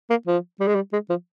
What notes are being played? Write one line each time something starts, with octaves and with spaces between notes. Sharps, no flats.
A#3
F3
G3
G#3
G3
G#3
F3